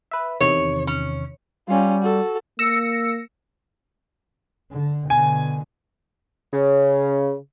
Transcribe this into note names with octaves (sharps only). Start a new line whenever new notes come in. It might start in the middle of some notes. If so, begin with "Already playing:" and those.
B4 E5
E2 C3 D#3 C#5
C#4
G3 C#4 F4
F#4 A4
A#3 E6 A#6 C#7
D3
B2 D3 G#5
C#3